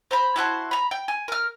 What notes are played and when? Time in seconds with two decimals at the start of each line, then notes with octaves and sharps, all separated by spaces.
0.11 C5 A#5 B5
0.36 E4 F#4 C5 A5
0.71 A#5 B5
0.91 G5
1.08 G#5
1.28 A#4 F6